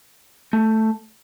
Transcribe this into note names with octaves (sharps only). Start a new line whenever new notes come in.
A3